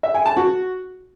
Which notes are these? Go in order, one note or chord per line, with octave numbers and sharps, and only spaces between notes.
E5
G#5
A5
F#4